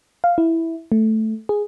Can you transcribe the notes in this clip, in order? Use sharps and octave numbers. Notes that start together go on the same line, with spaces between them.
F5
E4
A3
G#4